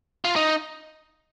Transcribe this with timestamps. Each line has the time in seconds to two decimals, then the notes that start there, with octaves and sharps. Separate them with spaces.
0.25 F4
0.36 D#4